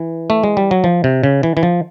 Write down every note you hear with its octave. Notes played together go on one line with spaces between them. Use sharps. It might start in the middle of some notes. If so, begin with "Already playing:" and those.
Already playing: E3
A3
G#3
G3
F#3
F3
C3
C#3
E3
E3
F3